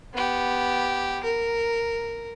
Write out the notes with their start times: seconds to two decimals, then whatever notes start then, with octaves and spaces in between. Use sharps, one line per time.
0.13 B3 G4
1.24 A#4